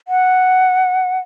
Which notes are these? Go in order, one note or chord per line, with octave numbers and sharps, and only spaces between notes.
F#5